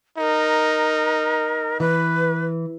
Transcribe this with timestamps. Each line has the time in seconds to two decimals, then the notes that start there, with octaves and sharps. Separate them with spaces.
0.18 D#4 A#4
1.80 E3 B4